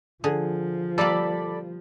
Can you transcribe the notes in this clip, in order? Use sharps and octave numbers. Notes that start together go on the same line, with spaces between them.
D3 F3 G#4
G3 A#3 A4 D5 B5